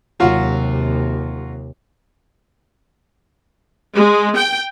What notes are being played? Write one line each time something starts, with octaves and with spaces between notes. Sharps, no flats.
D#2 C3 F#3 F4 F#4
G#3
G5